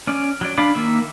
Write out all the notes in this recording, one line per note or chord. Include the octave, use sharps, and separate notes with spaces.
C#4 D5
F#3 D5
D4 D5 F5 B5 D6
D#3 A#3 E5